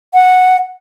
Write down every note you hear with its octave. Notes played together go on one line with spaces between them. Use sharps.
F#5